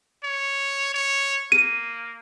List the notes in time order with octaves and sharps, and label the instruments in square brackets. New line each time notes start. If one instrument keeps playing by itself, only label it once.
[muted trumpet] C#5
C#5
[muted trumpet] A#3 [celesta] D#7